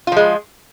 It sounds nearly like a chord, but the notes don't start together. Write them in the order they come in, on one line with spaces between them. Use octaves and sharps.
F4 F3 G#3